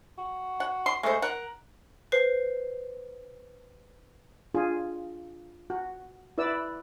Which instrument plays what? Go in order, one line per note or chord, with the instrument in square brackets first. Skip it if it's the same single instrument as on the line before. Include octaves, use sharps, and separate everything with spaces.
[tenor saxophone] F#4
[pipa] F#5
C6
[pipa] G#3 C5 [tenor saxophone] A3
[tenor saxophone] A#4 [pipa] F#5
[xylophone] B4 C5 C7
[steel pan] D4 F4 G#4
F#4
E4 B4 D5 E6